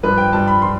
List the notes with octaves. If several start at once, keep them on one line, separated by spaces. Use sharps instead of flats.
G2 F3 B4
G5
G2 F3 A5
B5
F3 C6